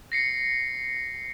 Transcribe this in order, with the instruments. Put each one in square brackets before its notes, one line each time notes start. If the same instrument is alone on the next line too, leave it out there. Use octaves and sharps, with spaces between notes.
[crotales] A#6 C7 C#7